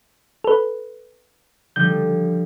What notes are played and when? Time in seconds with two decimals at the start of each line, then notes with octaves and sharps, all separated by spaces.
0.44 A4 B4
1.76 D3 F3 G3 G6